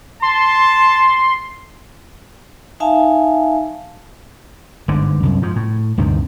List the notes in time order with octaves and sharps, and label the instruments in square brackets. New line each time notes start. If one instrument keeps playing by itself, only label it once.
[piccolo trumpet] A5 [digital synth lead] C6
[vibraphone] D#4 E5 F5 G#5 A5
[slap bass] G1 G#2 D3
C2 F#2
G#2 F3
A2
D2 G2 C3 D#3